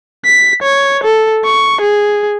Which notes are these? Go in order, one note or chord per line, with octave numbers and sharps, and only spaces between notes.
B6
C#5
A4
C#6
G#4